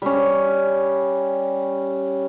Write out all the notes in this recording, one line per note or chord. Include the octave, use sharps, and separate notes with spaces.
G3 C#4